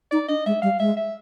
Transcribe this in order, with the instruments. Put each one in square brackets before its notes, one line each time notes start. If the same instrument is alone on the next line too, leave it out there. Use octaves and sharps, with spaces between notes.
[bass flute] D#4 [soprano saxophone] D5
[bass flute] D4 [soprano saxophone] D#5
[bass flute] G#3 [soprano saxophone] E5
[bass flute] G3 [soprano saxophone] F5
[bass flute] G#3 [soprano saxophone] E5
[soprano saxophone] E5